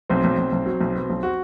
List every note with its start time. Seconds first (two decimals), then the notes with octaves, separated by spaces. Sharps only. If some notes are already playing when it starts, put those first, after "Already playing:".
0.10 B1 C4
0.24 B1
0.38 B1
0.52 B1
0.66 F#3
0.81 B1
0.95 B2
1.10 B1
1.23 F#4